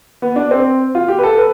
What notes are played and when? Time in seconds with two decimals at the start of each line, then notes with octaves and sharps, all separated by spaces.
0.22 B3
0.36 D4
0.51 C4
0.95 F4
1.08 G4
1.19 B4
1.23 A4
1.38 B4